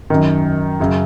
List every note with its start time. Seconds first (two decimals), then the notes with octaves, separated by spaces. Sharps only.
0.10 F#2 D#3
0.80 F#2 C#3